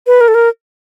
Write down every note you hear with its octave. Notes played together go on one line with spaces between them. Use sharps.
B4
A#4
A4
A#4